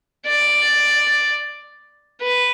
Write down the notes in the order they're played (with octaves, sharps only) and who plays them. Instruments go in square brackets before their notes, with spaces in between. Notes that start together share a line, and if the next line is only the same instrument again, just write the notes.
[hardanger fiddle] D5
B4